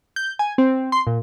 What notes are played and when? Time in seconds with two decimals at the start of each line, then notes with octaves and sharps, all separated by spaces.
0.16 G6
0.39 G#5
0.58 C4
0.92 C6
1.07 A#2